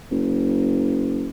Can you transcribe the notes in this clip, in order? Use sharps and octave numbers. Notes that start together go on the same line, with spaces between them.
F#1